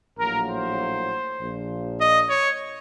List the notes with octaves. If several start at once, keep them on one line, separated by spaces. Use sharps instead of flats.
A#1 A2 F#3 A#3 A#4
C5
A#1 A#2 F3
D#5
C#5